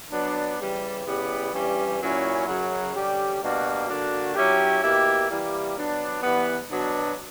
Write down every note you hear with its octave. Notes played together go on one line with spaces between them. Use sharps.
F#3 B3 D4
C#3 E3 G3
C#3 G3 B3 E4 G4
G2 E3 G3 C#4 G4
A#2 F#3 C#4 E4
F#2 C#3 F#3
D3 G3 C#4 G4
B2 G3 A#3 D4 F#4
D3 A#3 D4 F#4
F#3 C#4 E4 G4
B2 A#3 E4 G4
E3 G3 A#3 E4 G4
F#3 B3 D4
E3 G3 B3
B2 F#3 B3 D4